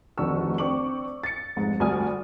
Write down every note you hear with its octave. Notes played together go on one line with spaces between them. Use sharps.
F1 D2 D#3 D4 C#6 E6
C4 D4 C#6 D6 F#7
A6 C#7
F1 G#2
D2 G2 D5 G#5 D#6 F6